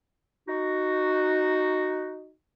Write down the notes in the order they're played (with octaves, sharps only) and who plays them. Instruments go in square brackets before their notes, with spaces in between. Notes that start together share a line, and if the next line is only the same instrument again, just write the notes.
[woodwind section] D#4 F#4